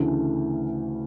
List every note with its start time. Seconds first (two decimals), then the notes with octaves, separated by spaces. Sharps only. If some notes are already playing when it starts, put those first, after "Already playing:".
Already playing: D2 C#3 E3 A3